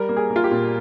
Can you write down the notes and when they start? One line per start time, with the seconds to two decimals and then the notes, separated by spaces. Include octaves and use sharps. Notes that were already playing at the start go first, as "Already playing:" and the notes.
Already playing: G3 A#4
0.09 A#3
0.17 G#4
0.30 A#3
0.36 F4
0.44 G4
0.51 A#2